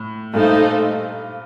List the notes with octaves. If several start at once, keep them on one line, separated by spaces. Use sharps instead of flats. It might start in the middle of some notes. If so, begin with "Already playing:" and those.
Already playing: A2
G2 A#2 A3 D#4 A4 C5